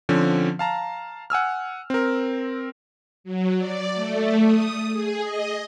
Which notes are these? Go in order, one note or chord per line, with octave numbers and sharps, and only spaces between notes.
D3 F3 C4 C#4
F5 A5 A#5
F#5 G#5 E6 F6
C4 A#4
F#3
D5
A3
D#6
G#4
D#5